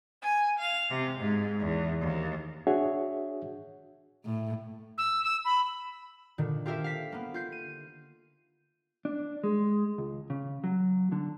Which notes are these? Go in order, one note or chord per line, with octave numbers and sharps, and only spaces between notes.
G#5
F5
C3
G#2
E2
D#2
D4 F#4 G#4 C#5 E5 F#5
A2
E6
E6
B5
A#2 D3 D#3
F4 G4 A4 A#4 E5 F5
F5 B6
A#3 B3
F4 G6 C7
D#7
D4
G#3
C#2
C#3
F#3
D3